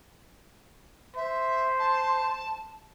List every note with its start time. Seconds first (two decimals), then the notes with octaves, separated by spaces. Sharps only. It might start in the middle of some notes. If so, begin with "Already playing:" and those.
1.16 C5 E5
1.79 A5